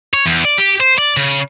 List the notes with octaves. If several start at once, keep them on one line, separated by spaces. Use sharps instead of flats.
C#5
E2
D5
G4
C5
D5
C#3